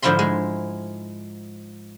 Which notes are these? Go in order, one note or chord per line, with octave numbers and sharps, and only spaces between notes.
G#2 D3 F3 E4 B5 C6
G#3